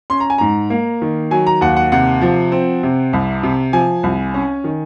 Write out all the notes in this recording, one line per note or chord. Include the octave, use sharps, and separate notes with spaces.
C#4 C6
A#5
G#5
G#2 A#5
A#3
D#3
F#3 G#5
A#5
D#2 F#5
F#5
C3 F#5
F3
C4
C3
C2
C3
F3 G#5
C2
C#4
D#3